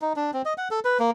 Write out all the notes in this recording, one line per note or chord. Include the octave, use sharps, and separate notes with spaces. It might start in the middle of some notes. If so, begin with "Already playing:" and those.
D#4
D4
C4
D#5
F#5
A4
B4
A#3